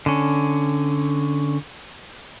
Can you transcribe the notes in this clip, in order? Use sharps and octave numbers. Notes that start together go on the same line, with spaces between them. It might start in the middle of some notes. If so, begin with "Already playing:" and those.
D3 C#4